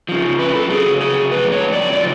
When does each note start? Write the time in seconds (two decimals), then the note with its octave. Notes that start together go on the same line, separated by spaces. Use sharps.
0.09 C#3 F3
0.39 B4
0.55 A4
0.70 C#3 F#3 G#4
1.01 G#4
1.31 A2 F3 B4
1.52 C#5
1.72 D5
1.93 C#3 F3 D5